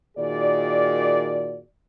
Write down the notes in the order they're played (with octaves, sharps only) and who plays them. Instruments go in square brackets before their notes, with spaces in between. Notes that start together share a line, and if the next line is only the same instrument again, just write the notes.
[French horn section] A#2 D#3 F#4 G#4 D5